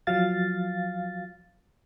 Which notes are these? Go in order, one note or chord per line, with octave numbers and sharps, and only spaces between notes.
F3 F#3 F5 A6